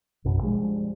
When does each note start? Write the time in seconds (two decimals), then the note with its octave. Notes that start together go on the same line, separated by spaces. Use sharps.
0.25 A#1 F#2 B2
0.42 F3 G3 G#3 D4